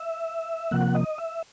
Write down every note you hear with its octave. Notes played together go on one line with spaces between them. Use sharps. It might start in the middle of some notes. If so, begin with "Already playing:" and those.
Already playing: E5
C3 F3 A#3 F#5
D#5
E5